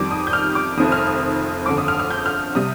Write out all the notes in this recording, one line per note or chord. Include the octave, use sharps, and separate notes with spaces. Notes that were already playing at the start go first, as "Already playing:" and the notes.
Already playing: F2 D#3 G3 D6
D#6
G6
F6
D6
F1 F2 D#3 D#6
F6
D#6
G1 F2 D3 D6
D#6
F6
F6
G6
F6
C3 G3 D#6